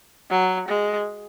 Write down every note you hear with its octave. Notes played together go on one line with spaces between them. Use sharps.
F#3
G#3